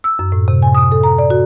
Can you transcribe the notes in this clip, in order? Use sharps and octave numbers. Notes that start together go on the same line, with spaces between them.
E6
F#2
A2
C3
G#5
D#6
A4
A#5
D5
F#4